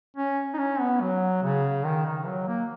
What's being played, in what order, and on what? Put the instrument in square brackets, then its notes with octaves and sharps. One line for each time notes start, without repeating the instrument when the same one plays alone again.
[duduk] C#4
D#4
C#4
B3
F#3
C#3
D#3
D#3
F#3
A#3